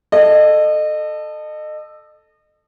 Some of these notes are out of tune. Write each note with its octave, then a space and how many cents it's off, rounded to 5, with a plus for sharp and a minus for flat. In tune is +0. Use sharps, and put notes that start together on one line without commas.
A4 +0 D#5 -30